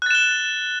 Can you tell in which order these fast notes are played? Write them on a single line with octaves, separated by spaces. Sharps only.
F#6 A6 E7 G7